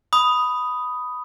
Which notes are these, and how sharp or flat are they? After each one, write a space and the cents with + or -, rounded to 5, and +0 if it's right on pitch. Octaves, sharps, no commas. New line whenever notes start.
B5 +5 D#6 +0